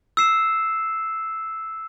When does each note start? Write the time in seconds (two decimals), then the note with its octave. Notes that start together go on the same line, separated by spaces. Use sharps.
0.17 E6 C7 E7